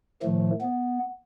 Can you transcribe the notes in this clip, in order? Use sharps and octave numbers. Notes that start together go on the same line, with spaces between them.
A2 D#3 F3 A3
B3